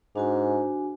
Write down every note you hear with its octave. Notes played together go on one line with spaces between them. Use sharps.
G#2 D4 F#4 G#5